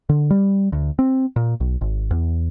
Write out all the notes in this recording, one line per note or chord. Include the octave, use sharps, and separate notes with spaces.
D3
G3
D2
C4
A#2
B1
G#1
E2